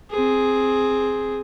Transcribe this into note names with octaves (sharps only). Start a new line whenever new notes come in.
C4 G#4